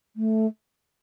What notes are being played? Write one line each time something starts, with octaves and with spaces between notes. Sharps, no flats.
A3